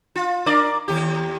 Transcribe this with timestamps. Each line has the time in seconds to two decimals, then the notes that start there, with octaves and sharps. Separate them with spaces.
0.16 F4
0.46 D4 A#4 D5
0.88 D#2 G4